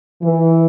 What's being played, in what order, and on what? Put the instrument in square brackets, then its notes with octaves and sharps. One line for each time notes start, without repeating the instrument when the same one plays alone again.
[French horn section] E3